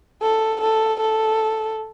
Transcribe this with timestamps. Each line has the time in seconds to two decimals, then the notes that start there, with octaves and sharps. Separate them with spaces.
0.22 A4
0.61 A4
1.00 A4